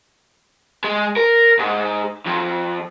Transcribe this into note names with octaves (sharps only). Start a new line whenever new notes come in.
G#3
A#4
G#2
F2